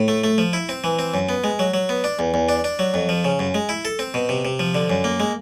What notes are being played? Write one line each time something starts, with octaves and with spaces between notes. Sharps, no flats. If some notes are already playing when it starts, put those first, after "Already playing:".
Already playing: A2
A3
A3
F3
E4
C4
E3
C4
F#2
B3
G#3
F#3
F#3
B3
D4
E2
E2
D4
D4
F#3
F2
F3
C#3
F#2
G#3
E4
A4
C4
B2
C3
C3
F3
D3
F#2
A#3
G#3